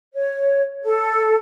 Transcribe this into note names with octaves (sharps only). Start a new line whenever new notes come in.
C#5
A4